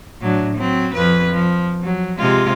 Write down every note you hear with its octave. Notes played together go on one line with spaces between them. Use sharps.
A2 F#3 D4
F#3 C4
F2 F3 B4
F3
F#3
C3 G#3 F4